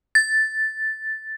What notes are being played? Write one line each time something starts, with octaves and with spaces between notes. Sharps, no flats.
A6